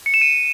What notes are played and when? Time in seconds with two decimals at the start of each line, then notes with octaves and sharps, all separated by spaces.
0.06 C#7
0.14 E7
0.21 D#7